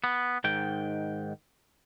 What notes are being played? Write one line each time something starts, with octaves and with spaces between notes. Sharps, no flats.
B3
G#2 D#3 G5